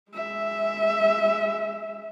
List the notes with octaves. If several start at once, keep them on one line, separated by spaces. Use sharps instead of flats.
G#3 E5